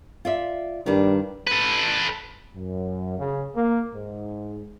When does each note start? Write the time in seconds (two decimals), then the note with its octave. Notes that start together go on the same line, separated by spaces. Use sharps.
0.25 F4 D5 E5
0.86 G2 D#3 G3 D4
1.47 A4 B4
2.54 F#2
3.18 C#3
3.56 A#3
3.93 G#2